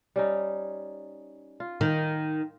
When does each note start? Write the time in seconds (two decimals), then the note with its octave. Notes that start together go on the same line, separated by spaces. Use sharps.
0.16 G3 C#4 D#4
1.60 F4
1.81 D#3